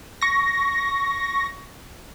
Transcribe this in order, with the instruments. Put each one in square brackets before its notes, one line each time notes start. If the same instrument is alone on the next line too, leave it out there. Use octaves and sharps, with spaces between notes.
[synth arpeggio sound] C#6 A#6